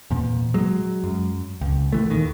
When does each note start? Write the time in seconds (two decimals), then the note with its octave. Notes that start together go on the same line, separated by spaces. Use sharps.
0.11 E2 A#2
0.54 F#3 G#3
1.04 F#2
1.61 C#2
1.92 A#1 E3 A3
2.10 D#2 D#3